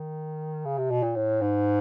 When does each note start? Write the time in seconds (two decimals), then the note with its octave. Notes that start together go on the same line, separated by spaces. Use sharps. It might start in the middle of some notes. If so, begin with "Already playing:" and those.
Already playing: D#3
0.65 C#3
0.78 C3
0.90 B2
1.03 A#2
1.16 A2
1.41 G#2